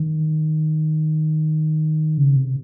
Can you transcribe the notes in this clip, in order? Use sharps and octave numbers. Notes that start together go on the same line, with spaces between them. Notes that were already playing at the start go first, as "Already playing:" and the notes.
Already playing: D#3
C#3
C3